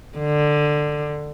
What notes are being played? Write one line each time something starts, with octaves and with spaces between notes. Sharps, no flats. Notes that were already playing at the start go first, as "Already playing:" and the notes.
D3